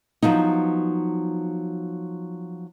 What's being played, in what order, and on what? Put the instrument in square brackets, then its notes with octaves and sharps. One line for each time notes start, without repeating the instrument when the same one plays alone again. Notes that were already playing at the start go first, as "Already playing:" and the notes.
[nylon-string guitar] F3 F#3 B3 D#4